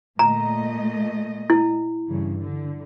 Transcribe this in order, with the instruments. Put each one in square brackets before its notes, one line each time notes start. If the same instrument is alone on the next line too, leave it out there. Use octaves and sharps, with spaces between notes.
[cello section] A#2 A3 D#5 [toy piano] A#5
[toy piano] E4
[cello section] G2 C#3 E3
D3